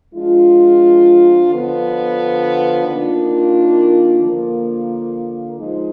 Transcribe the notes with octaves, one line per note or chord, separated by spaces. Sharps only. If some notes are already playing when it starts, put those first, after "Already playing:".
F3 G#3 D4 F4
D3 F3 B3
D#3 A#3 D4 F4
D3 F3 A#3
F3 G#3 D#4